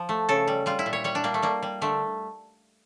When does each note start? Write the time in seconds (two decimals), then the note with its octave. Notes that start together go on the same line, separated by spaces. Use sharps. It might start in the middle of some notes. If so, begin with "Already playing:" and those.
Already playing: F3
0.09 A3
0.29 C#3 A4
0.48 G3
0.66 G3 F4
0.79 E4
0.86 A#2
0.93 C#5
1.04 G3 C#5
1.15 D4
1.24 G3 A#3
1.34 A3
1.42 G3 A#3
1.63 G3
1.82 D3 A3